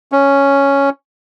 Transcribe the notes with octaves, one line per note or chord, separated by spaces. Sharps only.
C#4